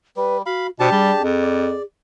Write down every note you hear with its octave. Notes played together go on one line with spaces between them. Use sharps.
G3 B4
F#4 F5 B5
B2 D4 G4 C5 A5
G3 G#4
F2
D5